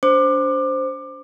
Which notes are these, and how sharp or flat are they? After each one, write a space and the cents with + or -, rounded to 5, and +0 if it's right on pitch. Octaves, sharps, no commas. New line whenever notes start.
D4 -35 C5 +0 D6 +25